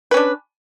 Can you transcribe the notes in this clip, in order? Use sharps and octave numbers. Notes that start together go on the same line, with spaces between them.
C#4 D4 B4